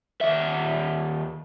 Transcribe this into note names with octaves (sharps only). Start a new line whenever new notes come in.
D#2 E5